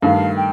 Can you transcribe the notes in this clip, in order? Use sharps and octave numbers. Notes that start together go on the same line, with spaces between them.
G2 D#3 A3 F5
G5